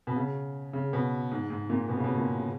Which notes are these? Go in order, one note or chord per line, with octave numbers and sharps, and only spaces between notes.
B2
C#3
C#3
B2
G#2
G#2
A#2
B2
C#3
B2
A#2
C#3